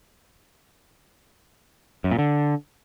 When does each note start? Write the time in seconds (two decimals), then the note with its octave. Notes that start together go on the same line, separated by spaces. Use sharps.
2.04 F#2
2.11 A#2
2.19 D3